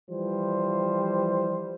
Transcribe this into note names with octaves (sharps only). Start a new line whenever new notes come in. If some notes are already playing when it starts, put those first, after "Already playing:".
E3 F3 G3 C5